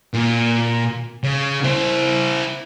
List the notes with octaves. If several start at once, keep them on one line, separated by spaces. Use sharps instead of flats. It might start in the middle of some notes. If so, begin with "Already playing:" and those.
A#2
C#3
E4 C5